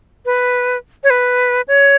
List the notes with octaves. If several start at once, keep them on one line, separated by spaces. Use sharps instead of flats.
B4
C#5
B4
C#5